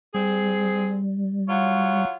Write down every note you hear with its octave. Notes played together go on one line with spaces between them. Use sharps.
G3 C4 G#4
F#3 F4 C#5